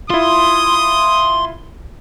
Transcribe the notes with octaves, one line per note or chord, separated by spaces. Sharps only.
E4 F4 C6 D#6